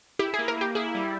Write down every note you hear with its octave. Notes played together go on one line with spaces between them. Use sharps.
E4 G4
G#4
A#3
A#4
A#3 G4
E4 G#4
G3